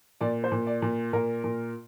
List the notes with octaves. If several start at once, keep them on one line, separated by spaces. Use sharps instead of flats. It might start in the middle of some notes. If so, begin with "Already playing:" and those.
A#2 D5
C5
A#2
D5
A#2
A#2 A#4
A#2